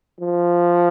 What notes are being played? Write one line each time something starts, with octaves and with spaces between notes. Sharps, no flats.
F3